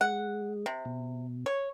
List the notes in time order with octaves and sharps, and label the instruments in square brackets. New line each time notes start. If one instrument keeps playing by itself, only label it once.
[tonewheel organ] G#3 [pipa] F#5
[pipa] C3
[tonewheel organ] B2
[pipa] C#5